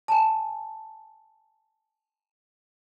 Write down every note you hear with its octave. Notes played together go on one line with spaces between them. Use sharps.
G#5 A5